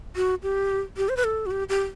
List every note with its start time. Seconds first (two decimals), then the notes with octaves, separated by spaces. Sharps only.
0.16 F#4
0.43 G4
0.97 G4
1.09 C5
1.17 B4
1.24 A4
1.46 F#4
1.51 G4
1.69 G4